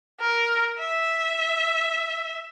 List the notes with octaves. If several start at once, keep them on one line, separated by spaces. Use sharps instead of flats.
A#4
E5